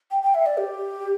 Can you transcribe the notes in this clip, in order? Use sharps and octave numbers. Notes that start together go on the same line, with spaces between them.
G5
G5
E5
D5
G4